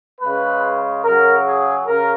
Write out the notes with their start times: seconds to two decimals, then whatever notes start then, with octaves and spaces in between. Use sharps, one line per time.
0.21 C#3 G#3 B4
1.04 C#3 F#3 A#4
1.45 G#4
1.86 C#3 A#4